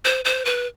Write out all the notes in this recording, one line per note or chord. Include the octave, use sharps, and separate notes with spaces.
C5
C5
B4